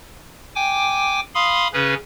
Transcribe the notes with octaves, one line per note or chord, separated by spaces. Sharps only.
G5 G#5 D6
F5 B5 C6 D#6
C#3 C#4 G#4 B4